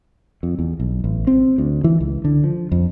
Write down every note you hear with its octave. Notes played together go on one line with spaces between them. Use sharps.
F2
E2
B1
A1
C4
D2
E3
C#2
D3
F3
F2